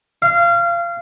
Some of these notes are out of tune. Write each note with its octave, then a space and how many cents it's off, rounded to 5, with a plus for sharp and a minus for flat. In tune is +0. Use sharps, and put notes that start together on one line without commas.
F5 -25